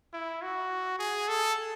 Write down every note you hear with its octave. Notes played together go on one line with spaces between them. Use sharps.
E4
F#4
G#4
A4